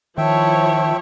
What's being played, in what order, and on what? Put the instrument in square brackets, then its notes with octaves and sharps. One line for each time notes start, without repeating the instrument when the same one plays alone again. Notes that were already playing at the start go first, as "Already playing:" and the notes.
[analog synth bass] D#3 [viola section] F3 E4 C#5 [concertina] E5 G5 [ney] A5